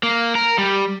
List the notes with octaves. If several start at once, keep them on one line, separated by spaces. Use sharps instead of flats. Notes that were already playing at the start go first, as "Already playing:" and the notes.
A#3
A#4
G3